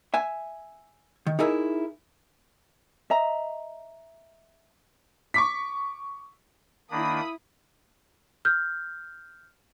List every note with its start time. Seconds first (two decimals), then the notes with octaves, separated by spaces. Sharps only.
0.14 E5 G#5
1.27 D#3
1.39 D#4 E4 G#4 A#4 E5
3.10 D#5 E5 A#5
5.34 C#6 D6 B6
6.91 D#3 A#3 D4 E4 B5 D#6
8.45 F6 G6